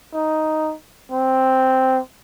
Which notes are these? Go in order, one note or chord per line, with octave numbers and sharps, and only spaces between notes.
D#4
C4